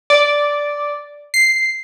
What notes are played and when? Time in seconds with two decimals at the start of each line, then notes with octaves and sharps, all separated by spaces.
0.10 D5
1.34 C7